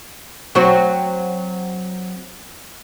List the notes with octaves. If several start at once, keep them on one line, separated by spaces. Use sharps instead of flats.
F#3 C4 F#4